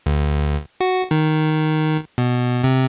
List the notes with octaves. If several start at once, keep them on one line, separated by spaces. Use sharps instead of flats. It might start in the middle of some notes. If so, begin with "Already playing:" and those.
D2
F#4
D#3
B2
C3